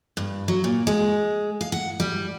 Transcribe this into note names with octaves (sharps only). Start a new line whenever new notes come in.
G2
F#3
A#2
G#3
F5
F#5
G3